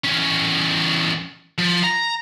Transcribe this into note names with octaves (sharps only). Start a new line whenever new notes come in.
E2 C#4
F3
A#5